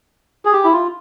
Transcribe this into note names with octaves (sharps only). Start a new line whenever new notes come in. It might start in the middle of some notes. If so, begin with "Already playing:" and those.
G#4
G4
E4
F4